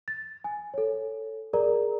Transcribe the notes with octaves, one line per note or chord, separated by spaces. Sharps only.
A6
G#5
A4 C#5
G#4 A#4 D5 A#5